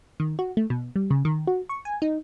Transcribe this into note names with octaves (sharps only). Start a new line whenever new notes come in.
D#3
F#4
A3
B2
G3
C#3
D#3
F#4
C#6
G#5
D#4